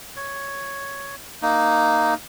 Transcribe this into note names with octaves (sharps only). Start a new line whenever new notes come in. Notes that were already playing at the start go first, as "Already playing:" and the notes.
C#5
A#3 D#4